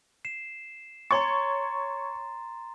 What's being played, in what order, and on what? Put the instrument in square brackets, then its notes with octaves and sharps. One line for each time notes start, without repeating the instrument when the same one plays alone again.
[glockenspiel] C7 E7
[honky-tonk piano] C#5 C#6 [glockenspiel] A#5 C6 A6